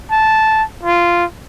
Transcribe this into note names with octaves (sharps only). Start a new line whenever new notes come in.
A5
F4